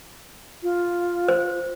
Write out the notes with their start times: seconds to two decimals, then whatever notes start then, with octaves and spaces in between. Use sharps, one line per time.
0.63 F4
1.28 C5